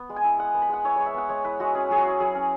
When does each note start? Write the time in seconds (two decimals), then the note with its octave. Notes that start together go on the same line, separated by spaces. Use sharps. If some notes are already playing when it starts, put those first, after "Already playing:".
Already playing: B3
0.09 G#3
0.16 G#5
0.24 E4
0.39 G#3 F#5
0.54 B3
0.62 B5
0.69 G#3 F#5
0.85 E4 C#5
0.96 G#3 C#5
1.06 E5
1.14 B3 F#5
1.29 G#3 C#5
1.45 E4 B4
1.60 G#3 F#4
1.75 C#4 G#4
1.90 F#3 G#4
1.98 F#4
2.05 E4
2.20 F#3 G#4
2.35 C#4